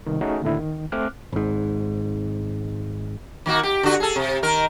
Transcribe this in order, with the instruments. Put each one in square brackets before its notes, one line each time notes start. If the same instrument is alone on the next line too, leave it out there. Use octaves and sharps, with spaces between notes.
[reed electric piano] C2 D#3
A3 C#4 D#4 F#4 G#4
D#2 A2 D3 E4
D#3
A3 C4 D6 F6 F#6
[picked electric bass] G#1 G#2
[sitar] D#3 A#3 F#4
G4
D3 F#4
G#4 A4
C3
D#3 A#4